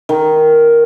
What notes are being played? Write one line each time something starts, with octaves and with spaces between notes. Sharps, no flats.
D#3